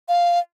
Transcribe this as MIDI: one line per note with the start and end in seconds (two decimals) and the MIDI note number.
0.08 0.39 77